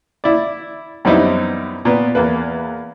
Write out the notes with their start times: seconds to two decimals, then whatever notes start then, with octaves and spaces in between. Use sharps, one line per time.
0.24 E4 D5
1.05 F#2 G3 B3 C4 D#4 E4
1.85 A#2 B3
2.15 E2 A#3 B4